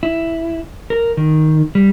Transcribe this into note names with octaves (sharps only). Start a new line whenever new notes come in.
E4
A#4
D#3
G3